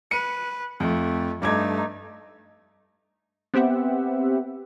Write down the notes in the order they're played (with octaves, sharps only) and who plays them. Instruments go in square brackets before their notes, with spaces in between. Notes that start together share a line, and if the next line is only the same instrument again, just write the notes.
[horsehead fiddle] B4 [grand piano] C#7 D#7
[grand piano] F2 [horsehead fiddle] A3
[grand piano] G2 D6 G#6 [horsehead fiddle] A3 D#4
[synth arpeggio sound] B3 C4 G4 E5 F#5